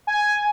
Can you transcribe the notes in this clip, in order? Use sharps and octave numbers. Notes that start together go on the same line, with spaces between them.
G#5